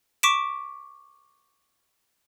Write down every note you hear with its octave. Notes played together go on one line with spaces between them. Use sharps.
C#6 D6 B6 D7 E7